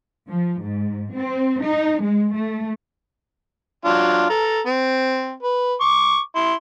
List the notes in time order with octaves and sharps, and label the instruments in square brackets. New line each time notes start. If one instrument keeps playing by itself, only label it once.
[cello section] F3
G#2
C4
D#4
G#3
A3
[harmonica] F#3 D4 F4
A4 A#5
C4
B4
C#6 D6
E4 C6